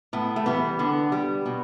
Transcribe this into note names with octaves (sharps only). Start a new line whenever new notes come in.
A2 B3
A3
E3 G3 B3
D3 B3
G3
B2